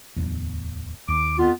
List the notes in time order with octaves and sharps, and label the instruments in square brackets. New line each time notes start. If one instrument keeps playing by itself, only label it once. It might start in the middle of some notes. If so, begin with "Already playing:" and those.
[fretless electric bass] D1 G1 E2
[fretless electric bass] D#2 [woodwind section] D6
[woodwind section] F2 B3 F4